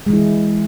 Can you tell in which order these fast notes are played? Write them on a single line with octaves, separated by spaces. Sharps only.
G#3 E3 E4